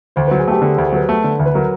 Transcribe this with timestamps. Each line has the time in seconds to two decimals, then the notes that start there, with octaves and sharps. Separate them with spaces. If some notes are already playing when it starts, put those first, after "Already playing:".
0.16 D2 C5
0.27 F#3 B4
0.39 G#4
0.48 A3 G4
0.58 A4
0.62 D3 G#4
0.74 C5
0.78 D2
0.85 C5
0.93 F#3 B4
1.09 A3
1.24 D3
1.39 D2
1.46 B4
1.54 F#3 A#4